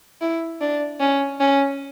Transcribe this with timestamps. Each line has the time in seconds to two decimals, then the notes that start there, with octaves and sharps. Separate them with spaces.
0.21 E4
0.61 D4
1.00 C#4
1.40 C#4